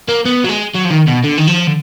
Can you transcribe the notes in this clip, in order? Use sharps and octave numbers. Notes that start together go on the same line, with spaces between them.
A#3
B3
F#3
G#3
F#3
F3
D#3
B2
D3
D#3
F3
D3